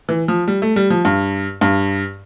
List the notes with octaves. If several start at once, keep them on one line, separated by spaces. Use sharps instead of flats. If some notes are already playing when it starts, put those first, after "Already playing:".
E3
F3
G3
A3
G3
F3
G2
G2